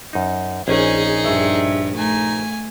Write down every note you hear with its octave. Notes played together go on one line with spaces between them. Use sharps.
F#2 D#4
A#1 C#4 D#4 G#4
G2 E5
A3 D#4 G#5